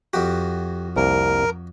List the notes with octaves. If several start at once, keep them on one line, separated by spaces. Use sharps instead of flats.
F2 F#4 G4
C2 A#3 A#4